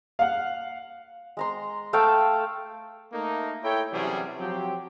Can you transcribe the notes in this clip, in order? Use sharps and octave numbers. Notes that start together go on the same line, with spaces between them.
F5 F#5
G#3 A#5 C6
A3 A4 F5 G5
A3 A#3 D#4
E4 A4 C#5 G5
C3 E3 F#3 G3 C#4 G#4
F3 F#3 C4 G4